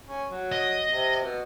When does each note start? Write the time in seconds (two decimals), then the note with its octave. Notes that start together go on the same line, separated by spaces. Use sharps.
0.08 C#4
0.31 F#3
0.52 D#5
0.88 C3
1.23 B2